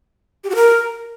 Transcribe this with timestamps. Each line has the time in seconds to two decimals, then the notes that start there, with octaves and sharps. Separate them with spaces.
0.44 G4
0.50 F#4
0.56 A#4